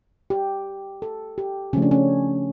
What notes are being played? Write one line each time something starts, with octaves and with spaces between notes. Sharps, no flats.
G4
A4
G4
C#3 F3 A3 C#4
D4
C#4